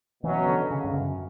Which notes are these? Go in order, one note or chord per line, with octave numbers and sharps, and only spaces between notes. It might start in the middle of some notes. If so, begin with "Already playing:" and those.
B2 E3 F#3 C#4
D3
C#3
G2
F#2